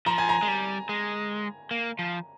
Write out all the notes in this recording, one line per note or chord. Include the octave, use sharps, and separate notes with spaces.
F3 A#5
G#5
A#5
G#3
G3
G#3
A#3
F3